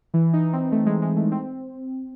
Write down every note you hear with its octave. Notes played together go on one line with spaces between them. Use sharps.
E3
D#4
C4
A3
G#3
G#3
A3
C4